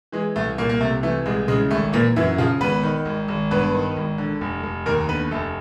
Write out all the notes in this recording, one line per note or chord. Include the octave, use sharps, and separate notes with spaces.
E3 G#3
C2 A3
C2 A#2 A#3
A#3
C3 A3
E3 A3
C2 G#3
C#3 G#3
G#1 A3
A#2 E3 A#3
F#2 E3 E4
C#3 F3 F4
G#1 B3 B4
D#3
G#1
G#1
G2 B3 B4
D#3
G#1
D3
F1
F1
D#2 A#3 A#4
D3 B3 B4
F1 A3 A4